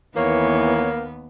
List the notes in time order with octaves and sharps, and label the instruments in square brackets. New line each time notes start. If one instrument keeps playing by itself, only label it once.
[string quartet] D#2 B3 [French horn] E3 [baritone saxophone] A#3 [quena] C#5